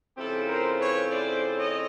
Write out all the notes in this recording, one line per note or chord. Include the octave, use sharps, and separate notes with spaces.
C#3 F3 A3 C4 E4 G4 A4
A#4 C5
B4 C#5
C5 D5
C#5 D#5